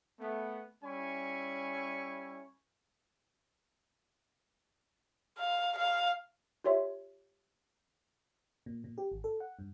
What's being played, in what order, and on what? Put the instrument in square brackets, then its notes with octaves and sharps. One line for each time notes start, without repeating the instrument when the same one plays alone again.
[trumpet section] A3 B3
G3 C#4 E4 G#5 B5 C#6
[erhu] F5
F5
[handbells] F4 G4 C#5 E5 C6
[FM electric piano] A#2
A#2
G4
G#1
A4
F#5
G2